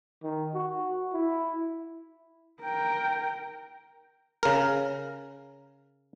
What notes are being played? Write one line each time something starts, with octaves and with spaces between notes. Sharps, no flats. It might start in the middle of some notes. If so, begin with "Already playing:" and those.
D#3
F#4
E4
A#4 G5
C#3 A#4